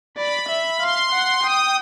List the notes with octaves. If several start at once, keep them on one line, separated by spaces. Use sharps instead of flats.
D5 B5
E5
F5 C6
F#5
G5 D#6